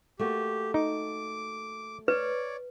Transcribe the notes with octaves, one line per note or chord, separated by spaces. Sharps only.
A3 A#3 F#4 G4
D#4 D6
B4 C#5 D5